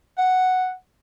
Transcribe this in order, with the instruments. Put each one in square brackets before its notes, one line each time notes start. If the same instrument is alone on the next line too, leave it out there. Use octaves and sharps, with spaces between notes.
[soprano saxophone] F#5